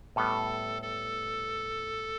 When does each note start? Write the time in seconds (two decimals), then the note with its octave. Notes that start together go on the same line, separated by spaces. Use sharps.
0.16 A2 G3 B3 A4
0.82 A4